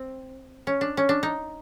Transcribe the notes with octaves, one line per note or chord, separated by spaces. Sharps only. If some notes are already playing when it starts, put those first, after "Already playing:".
Already playing: C4
C#4
D4
C#4
D4
D#4